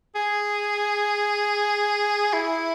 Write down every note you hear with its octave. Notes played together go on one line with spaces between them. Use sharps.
G#4
E4